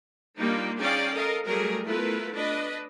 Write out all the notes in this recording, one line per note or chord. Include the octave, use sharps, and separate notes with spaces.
G3 A#3 D4 D#4 F4
C#4 D#4 G#4 D5 F5 G5
A4 A#4 D#5 F5
F#3 G3 A3 G#4 A#4
A3 B3 E4 F4 A#4 B4
D4 B4 D#5